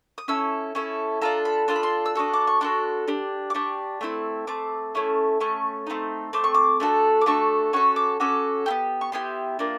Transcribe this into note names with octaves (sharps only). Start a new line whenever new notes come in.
D#6
C#4 E4 A4 E6
C#4 E4 A4
D4 F4 A4 A#5
B5
D4 F4 A4 C6
B5
C6
E6
D4 F#4 A4 D#6
D6
C#6
D4 F#4 A4 C6
D4 G4
D6
D4 G4 C#6
A3 C4 E4
A3 C4 D6
A3 C#4 E4
A3 C#4 C#6
A3 C4 D#4
A3 C4 D6
C#6
D6
A3 D4 F#4 A4
D6
A3 D4 F#4 A4 C#6
C#4 F#4 A4 C#6
D6
C#4 F#4 A4 D6
B3 E4 G4
C#6
B3 E4 G4 C6
A#3 D4 F4